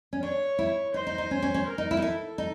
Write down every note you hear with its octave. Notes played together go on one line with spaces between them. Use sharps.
C#4
D4 C#5
E4
D#4 C5
D#4
D#4
C#4
C#4
C#4
A#4
D#4
E4
D#4
E4 A4
D#4